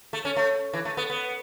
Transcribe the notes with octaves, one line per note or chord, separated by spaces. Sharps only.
A3
C#4
A3
E3
A3
B3
B3